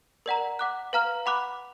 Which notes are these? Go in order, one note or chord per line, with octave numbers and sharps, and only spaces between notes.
A#4 D5 F#5 A#5
F#5 D6 F#6
B4 F5 A#5 F6
F#5 B5 D6 F#6